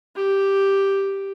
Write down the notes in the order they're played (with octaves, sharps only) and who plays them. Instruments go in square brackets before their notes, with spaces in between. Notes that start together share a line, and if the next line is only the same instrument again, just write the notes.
[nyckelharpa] G4